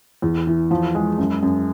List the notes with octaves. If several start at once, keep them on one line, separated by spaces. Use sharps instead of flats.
E2
E3
F3
G#3
F#2
F#2